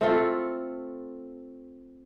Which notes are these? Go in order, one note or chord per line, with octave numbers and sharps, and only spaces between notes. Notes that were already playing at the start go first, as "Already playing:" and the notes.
A3 C4 F4 A4